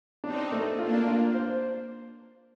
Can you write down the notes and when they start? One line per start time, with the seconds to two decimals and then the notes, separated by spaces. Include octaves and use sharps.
0.24 C4 D4 D#4
0.52 A3
0.79 A#3 D4 F4
1.07 F4
1.34 C5